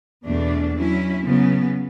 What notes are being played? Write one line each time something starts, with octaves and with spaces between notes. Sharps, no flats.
E2 B2 A3 D4
F#3 C#4 E4
C#3 F#3 B3